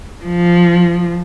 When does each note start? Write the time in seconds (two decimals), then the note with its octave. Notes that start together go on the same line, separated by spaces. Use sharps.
0.25 F3